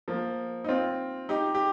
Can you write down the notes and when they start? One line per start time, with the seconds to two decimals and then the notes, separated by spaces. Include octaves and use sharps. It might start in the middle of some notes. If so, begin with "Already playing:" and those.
0.08 F3 A#3
0.64 D#4
0.68 C4 F4
1.29 D#4 G4
1.55 G4